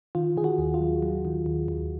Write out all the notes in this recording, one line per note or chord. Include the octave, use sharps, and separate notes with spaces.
D#3 F4
D#3 G#4
F#4
D#2
F4
F#3
F#3
D#3
D#2
D#2